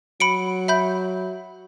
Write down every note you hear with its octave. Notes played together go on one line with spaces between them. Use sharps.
F#3 B5 C#7 D7
E5 B5 G6